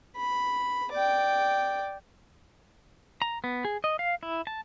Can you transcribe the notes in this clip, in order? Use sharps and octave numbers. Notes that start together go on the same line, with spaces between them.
B5
D5 G5
A#5
B3
G#4
D#5
F5
E4
A5